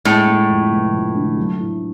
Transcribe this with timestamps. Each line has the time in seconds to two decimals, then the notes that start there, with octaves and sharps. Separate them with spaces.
0.05 A2 G#3
0.28 G#3
0.49 F2
0.71 F1
0.93 F2
1.15 D3
1.37 F#3
1.59 A2